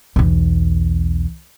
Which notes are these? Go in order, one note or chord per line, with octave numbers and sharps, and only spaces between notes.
B1 E2